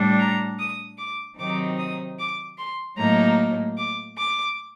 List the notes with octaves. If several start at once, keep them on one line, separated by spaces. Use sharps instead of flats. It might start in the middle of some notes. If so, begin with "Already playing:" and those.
Already playing: A2 G3 D4
A#5
D#6
D6
C3 D#3 F#3 C4 D#4 D6
D#6
D6
C6
A2 F#3 A#3 D#4 A#5
D6
D6